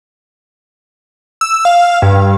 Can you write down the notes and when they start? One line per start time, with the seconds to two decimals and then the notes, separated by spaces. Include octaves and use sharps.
1.41 E6
1.65 F5
2.02 G2